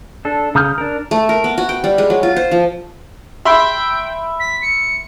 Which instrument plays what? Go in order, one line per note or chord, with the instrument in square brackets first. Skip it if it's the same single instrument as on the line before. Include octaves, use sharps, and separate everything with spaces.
[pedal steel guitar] D4 A4
C#3 A#5 D#6 F6 G6
D4 A#4
[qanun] A3
A#4
B3
F#4
G5
G3
G#3
F#3
F4
C5
F3
[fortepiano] E5 B5 C6 [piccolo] G5
[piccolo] B6
C#7